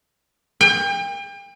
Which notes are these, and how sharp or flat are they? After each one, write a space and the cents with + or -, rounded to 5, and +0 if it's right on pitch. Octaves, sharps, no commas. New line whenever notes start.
G5 +35